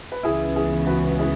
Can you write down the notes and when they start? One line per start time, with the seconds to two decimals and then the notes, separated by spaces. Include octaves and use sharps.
0.12 B4
0.23 C#2 C#3 E3 B3 E4 G#4
0.55 E4 G#4
0.87 F#4 B4
1.19 E4 G#4